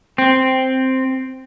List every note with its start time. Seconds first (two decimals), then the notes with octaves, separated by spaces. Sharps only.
0.18 C4